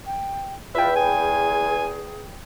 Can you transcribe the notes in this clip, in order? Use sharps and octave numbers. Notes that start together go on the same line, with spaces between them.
G5
E2 F4 B4 E5 G5
G#4 G#5